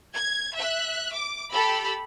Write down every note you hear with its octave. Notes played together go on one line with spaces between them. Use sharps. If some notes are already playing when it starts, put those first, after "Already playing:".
G#6
E5 F#6
D6
G4 A4 B5 E6